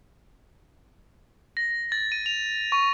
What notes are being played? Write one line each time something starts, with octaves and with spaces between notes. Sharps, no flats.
A#6
A6
D#7
F7
C#6